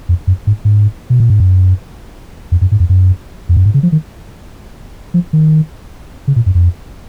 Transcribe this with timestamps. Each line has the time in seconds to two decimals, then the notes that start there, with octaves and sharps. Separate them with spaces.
0.09 F2
0.27 F#2
0.47 G#2
0.65 G#2
1.10 B2
1.20 A#2
1.30 G#2
1.40 F#2
2.52 F2
2.61 F#2
2.72 G#2
2.80 F2
2.89 F#2
3.49 F2
3.57 F#2
3.65 G#2
3.74 C#3
3.83 F3
3.92 D#3
5.14 F3
5.33 D#3
6.28 C#3
6.36 A#2
6.46 F#2
6.55 F2